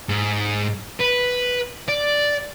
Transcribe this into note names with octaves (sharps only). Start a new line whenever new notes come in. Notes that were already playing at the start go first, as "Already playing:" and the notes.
G#2
B4
D5